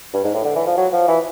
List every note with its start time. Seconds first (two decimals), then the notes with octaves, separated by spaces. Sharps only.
0.14 G2
0.24 G#2
0.34 A2
0.45 D3
0.55 E3
0.67 F3
0.77 F#3
0.93 F3
1.08 E3